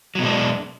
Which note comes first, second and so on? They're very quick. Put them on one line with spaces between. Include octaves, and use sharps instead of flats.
F#3 B2 G#3 D4